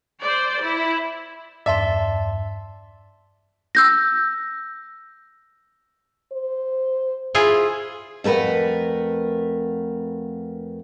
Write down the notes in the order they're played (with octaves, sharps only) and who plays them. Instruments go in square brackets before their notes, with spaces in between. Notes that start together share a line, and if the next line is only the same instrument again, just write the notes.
[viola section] C5 D5
E4
[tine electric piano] E2 G2 [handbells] D5 A5 C6 [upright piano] E5
[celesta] E6 G6 A#6
[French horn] C5
[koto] E4 F4 G#4
[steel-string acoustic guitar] F2 A3 A#4 B4 F#5